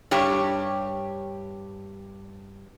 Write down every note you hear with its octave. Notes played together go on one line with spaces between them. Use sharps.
G2 G4 C#5